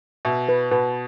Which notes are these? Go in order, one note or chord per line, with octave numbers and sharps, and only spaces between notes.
B2 E5
B4
B2 B4